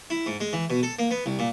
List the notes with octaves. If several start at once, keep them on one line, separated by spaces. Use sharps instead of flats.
E4
G#2
G#3
E3
B2
A4
A#3
B3
C2
A#2